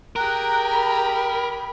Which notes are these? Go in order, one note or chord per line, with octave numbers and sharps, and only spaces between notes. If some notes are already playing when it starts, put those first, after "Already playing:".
G4 G#4 A#4 A#5 F#6
B5